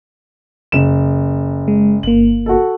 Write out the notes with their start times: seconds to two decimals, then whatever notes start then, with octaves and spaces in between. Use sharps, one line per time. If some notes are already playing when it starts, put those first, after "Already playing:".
0.72 F#1 E7
1.68 G#3
2.03 G1 A#3 F#7
2.46 F#4 A4